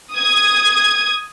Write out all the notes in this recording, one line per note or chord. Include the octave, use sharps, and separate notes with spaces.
D#6 G#6